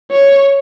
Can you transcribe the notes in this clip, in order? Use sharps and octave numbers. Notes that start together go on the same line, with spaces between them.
C#5